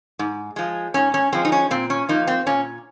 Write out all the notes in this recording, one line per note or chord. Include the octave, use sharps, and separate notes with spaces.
G#2
F3 G#3
G#2 C#4
C#4
F3 G#3 C4
D#4
C#4
A#2 C4
C#4
F3 A#3 D#4
C4
A#2 C#4